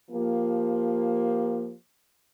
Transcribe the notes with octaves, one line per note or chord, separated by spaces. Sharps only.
F3 A#3 G4